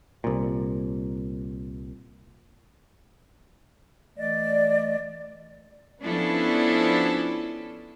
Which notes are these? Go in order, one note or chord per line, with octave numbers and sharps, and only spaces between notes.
C2 A#2
E3 A3 D5 D#5
F3 B3 C#4 D4 E4 A4